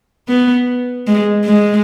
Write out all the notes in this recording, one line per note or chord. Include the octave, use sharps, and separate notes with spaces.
B3
G#3
G#3